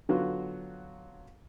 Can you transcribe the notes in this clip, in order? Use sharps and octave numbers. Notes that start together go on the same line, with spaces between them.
D3 F#3 B3 F4 F#4